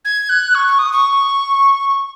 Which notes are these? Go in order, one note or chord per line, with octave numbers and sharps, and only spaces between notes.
G#6
F#6
C#6
C#6
D#6
C#6